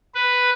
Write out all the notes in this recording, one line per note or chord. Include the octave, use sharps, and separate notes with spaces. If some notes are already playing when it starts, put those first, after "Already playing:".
B4